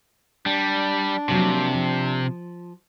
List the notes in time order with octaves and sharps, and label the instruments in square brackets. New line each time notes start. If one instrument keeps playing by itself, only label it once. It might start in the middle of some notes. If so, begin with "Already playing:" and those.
[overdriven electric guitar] G3 [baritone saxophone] D4
[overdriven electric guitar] C3 [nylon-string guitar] F3 F#3 A#3
[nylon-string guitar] F3